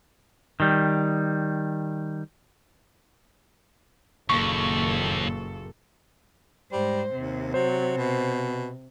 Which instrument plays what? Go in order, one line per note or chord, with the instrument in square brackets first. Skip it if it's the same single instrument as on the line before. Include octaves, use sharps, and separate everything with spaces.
[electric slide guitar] D#3 G3
[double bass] F#1 [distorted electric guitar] D#2 [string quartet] A#2 A4 [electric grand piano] C#6
[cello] G#2 C5 [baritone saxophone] G3
[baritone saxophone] D#2 [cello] C3
[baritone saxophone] F#3 [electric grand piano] C5
[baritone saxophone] B2